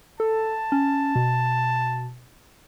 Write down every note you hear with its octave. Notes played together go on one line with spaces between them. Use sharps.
A4 A5
C#4
B2